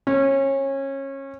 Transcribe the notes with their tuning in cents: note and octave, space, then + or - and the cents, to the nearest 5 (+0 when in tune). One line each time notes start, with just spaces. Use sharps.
C#4 -25